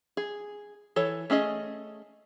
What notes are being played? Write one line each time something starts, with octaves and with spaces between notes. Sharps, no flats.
G#4
E3 A4 C#5
A3 C#4 G#4 D#5